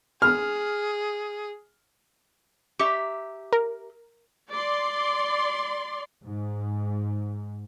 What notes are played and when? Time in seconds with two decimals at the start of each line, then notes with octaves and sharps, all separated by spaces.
0.22 G#4 F6
2.79 G4 E5 A#5 C#6
3.53 A#4
4.51 D5 C6
6.24 G#2